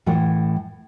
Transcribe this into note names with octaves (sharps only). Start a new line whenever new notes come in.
A2 E3 F#5 G5